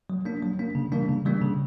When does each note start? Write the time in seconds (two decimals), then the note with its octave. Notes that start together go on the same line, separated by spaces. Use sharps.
0.10 F#3
0.25 A#3 D4
0.42 F#3
0.59 A#3 D4
0.75 C#3
0.92 E3 G3 A#3 D4
1.09 C#3
1.25 E3 G3 A#3 D4
1.42 C#3